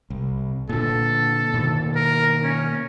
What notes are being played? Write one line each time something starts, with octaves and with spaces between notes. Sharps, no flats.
C2
A#2 D3 A4
B2 D#3 A#3
A#4
C#4